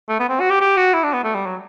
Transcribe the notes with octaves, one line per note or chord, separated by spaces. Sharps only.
A3
B3
C4
F#4
G4
G4
F#4
E4
D4
B3
A3
G3
F#3